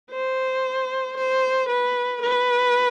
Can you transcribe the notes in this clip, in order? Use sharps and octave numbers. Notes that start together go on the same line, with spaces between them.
C5
C5
B4
B4